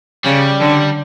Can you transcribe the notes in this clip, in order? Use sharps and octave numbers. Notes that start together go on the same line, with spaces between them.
C#3 G3
D3